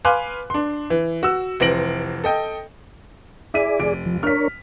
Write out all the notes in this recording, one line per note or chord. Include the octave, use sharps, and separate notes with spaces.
B4 F5 G#5 C6 D6 F#6
D4 C6
E3
F#4 E6
F1 E3 C4 A#6 D7 F#7
A4 D#5 G5
E4 G#4 D5 B6 D#7
F1 D7
F3
D4 A#4 C#5 F6 B6